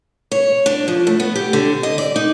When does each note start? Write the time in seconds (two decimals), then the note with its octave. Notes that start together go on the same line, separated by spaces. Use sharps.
0.31 C#5
0.66 D4
0.88 F3
1.07 A3
1.20 B3
1.35 G4
1.53 D3
1.83 D#5
1.98 D5
2.16 D#4